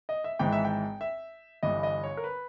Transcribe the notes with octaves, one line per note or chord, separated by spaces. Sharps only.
D#5
E5
G#1 G#2 E3 G5
E5
G5
E5
G1 G2 E3 D#5
D#5
C#5
A#4
B4